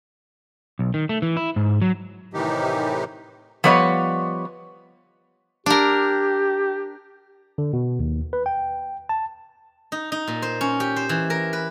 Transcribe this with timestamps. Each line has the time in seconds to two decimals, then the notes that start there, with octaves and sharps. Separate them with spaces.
0.79 B1
0.94 D#3
1.09 A3
1.22 E3
1.37 E4
1.56 G#2
1.81 F#3
2.34 A2 C3 D#3 E3 D#4 G4
3.64 F3 G3 B3 C#5 D#5
5.66 D4 G4 A#4
7.58 D3
7.73 B2
7.99 D#2
8.33 B4
8.46 G5
9.09 A5
9.92 D#4
10.12 D#4
10.28 A#2
10.42 C5
10.61 C#4
10.80 G4
10.96 C5
11.09 E3
11.30 A#4
11.53 B4